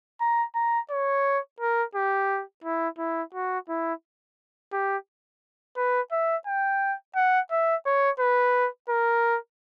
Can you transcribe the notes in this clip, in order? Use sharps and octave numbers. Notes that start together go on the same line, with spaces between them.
A#5
A#5
C#5
A#4
G4
E4
E4
F#4
E4
G4
B4
E5
G5
F#5
E5
C#5
B4
A#4